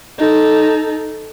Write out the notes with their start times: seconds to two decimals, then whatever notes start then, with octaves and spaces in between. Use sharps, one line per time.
0.18 D#4 A4